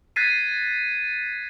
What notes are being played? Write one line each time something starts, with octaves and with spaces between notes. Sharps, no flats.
F#6 G#6 A6 B6 C7 D#7